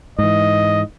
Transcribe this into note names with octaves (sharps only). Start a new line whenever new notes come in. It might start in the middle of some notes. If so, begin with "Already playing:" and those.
G#2 E3 D#5